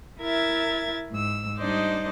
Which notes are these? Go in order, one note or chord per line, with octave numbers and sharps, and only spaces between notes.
E4 A#4 E5 G#6 A6
G#2 E6
G3 D4 D#4 C5 D5 D#5